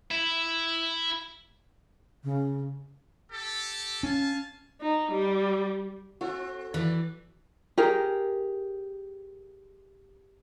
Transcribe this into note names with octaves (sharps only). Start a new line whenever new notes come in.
E4
C#3
G4 A4
C#4 F5 G#5 A5
D#4
G3
C4 F#4 A4
E3 A3 B4 D5
G4 G#4 A#4